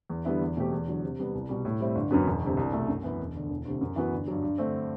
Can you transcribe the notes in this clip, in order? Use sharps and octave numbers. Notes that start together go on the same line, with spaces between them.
E2
D3 G3 B3 E4
E2
B2 A3 C4 G4
E2
D3 F#3
C3
G3 B3
C2
B2 G3
A2
G3 C4 E4
G1
F#2 F#3 B3
E1
D2 C3
C2
B2 A3
F#2
E3 B3 E4
E1
D2 D3
E1
D2 C3
F#2
E3 B3 F#4
G1
G2 F#3
G2
D3 A3 C4